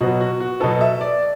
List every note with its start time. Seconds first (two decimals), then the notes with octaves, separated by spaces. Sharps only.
0.01 B2 F#3 B3 F#4
0.21 F#4
0.40 F#4
0.60 B2 F#3 B3 A4
0.81 E5
1.01 D5